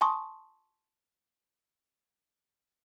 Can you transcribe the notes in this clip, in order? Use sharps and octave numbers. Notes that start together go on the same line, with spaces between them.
G#5 A5 C6 C#6 D#6